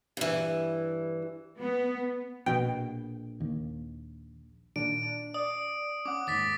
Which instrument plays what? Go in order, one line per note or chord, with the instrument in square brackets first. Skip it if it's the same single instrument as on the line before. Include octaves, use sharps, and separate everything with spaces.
[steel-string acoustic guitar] G2 E3
[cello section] B3
[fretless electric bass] A#1 [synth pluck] B2 G5
[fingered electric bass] D#2
[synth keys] A#2 D#3 D4 [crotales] D7
[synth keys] D4
[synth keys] D5 [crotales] D#6
[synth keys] C#4 F#5 [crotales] D6
[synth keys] D#2 G#2 [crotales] D6 A6 B6